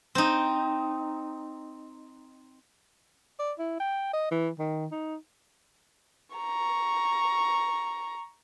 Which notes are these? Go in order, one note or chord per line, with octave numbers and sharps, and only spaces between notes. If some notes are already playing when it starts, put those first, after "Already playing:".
C4 D#4
D5
E4
G5
D#5
E3
D#3
D#4
A#5 C#6